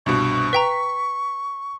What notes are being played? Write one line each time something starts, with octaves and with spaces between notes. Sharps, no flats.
C2 G2 B2 C#6
B4 G5 A#5 B6